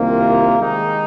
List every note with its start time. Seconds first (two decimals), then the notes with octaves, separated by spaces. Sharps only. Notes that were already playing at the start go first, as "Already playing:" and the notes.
Already playing: C2 C3 D#3 A#3 F4
0.58 D#3 G#3 D#4